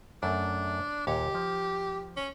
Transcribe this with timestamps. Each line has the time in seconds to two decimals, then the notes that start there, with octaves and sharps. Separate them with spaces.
0.23 F#2 A3 D4
1.07 D#2 A#2 G4 C#5
1.35 F3
2.17 C#4